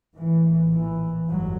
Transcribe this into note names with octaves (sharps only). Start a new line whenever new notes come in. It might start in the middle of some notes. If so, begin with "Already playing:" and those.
A#1 A2 E3
E3
G1 F2 F#3